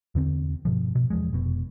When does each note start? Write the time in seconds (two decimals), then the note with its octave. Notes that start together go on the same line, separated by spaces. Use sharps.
0.15 E2 D3 C4
0.65 G2 B2 F3
0.95 B2
1.10 E2 F3 G#3
1.33 F1 B2